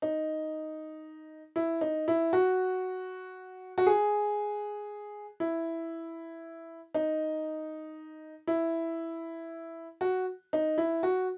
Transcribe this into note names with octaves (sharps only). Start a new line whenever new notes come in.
D#4
E4
D#4
E4
F#4
F#4
G#4
E4
D#4
E4
F#4
D#4
E4
F#4